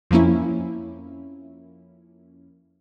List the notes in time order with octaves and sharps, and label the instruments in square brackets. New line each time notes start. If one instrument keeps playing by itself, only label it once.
[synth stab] F2 F3 A#3 C#4 E4